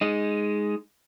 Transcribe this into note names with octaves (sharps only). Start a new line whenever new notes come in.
G#3 D#4